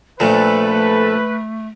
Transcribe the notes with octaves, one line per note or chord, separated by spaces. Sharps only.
A#1 A#2 A3 A4 B4